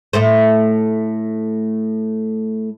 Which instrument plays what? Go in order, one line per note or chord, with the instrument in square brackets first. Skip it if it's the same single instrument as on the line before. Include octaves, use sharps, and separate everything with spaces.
[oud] A2 A3 C5